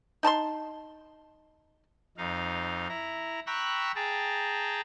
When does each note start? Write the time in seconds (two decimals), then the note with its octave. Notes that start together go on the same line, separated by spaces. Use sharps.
0.23 D#4 A5 A#5 C6
2.17 F2 D#4 F5
2.89 E4 A#5
3.47 G5 A#5 B5 C#6 E6 F#6
3.95 G#4 G5 A5 A#5